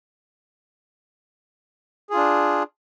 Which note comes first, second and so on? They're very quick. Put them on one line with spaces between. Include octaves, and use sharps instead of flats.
G#4 F4 D4